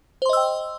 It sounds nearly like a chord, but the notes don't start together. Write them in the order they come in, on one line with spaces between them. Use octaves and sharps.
C5 C6 D#5 E6 G5